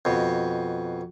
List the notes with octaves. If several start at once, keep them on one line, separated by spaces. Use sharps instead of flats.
F2 B2